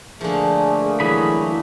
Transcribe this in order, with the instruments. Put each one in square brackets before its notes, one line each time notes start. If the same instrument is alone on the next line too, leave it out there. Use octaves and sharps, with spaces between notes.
[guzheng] D3 F3 [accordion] A3 A#3 [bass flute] G#4
[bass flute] E3 [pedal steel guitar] F#3 G#4 B5